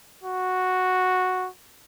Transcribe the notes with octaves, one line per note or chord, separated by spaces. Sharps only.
F#4